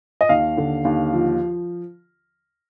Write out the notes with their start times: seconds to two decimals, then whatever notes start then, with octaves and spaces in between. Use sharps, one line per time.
0.21 D#5
0.29 D#2 F5
0.57 D3
0.85 D#2
1.13 F3